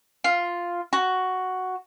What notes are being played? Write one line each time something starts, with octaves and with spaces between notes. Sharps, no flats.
F4
F#4